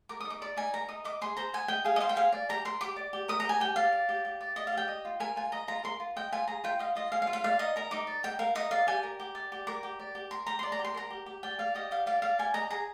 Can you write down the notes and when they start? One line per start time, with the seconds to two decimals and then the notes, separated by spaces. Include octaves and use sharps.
0.09 A#4 D6
0.20 D#6
0.25 D#4
0.30 D6
0.42 D5 D6
0.57 D#4 G#5
0.73 A#4 A#5
0.88 D#4 D#6
1.05 D#5 D6
1.21 G#4 C6
1.37 C5 A#5
1.53 G#4 G#5
1.68 D#5 G5
1.84 G#4 F5
1.96 D#5
2.01 C5 F5
2.09 G5
2.16 G#4 F5
2.32 D5
2.49 G4 A#5
2.65 A#4 C6
2.81 G4 D6
2.96 D5
3.13 G4
3.28 A#4 D#6
3.40 G4 A#5
3.49 G#5
3.60 G4 G5
3.76 D5 F5
3.92 D5
4.09 G4
4.25 G4
4.41 D5
4.56 D5 D#5
4.67 F5
4.72 G4
4.77 G5
4.88 D#5
5.05 F4
5.20 A#4 G#5
5.36 F4 G#5
5.52 D#5 A#5
5.68 F4 A#5
5.83 A#4 C6
6.00 F4
6.16 D#5 G5
6.32 F4 G#5
6.48 G#4 A#5
6.64 F4 G5
6.79 D#5 F5
6.95 F4 D#5
7.12 G#4 F5
7.22 F5
7.27 F4
7.33 F5
7.44 D5 F5
7.59 D#4 D#5
7.76 A#4 A#5
7.91 D#4 D6
8.07 D5
8.23 D#4 G5
8.39 A#4 F5
8.55 D#4 D#5
8.71 D5 F5
8.87 G4 G#5
9.03 A#4
9.20 G4
9.35 D5
9.52 G4
9.67 A#4 D6
9.83 G4
9.99 D5
10.15 G4
10.31 A#4 C6
10.47 G4 A#5
10.59 D5 C6
10.72 A#5
10.79 G4
10.84 C6
10.94 A#4 A#5
11.10 G4
11.26 G4
11.43 D5 G5
11.59 D5 F5
11.75 G4 D#5
11.91 G4 F5
12.06 D5 F5
12.22 D5 F5
12.39 G4 G#5
12.54 D#5 A#5
12.70 G#4 A#5